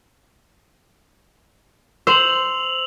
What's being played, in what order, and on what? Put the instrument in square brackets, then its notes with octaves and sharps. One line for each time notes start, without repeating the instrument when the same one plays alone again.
[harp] C5 [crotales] E6 F7 F#7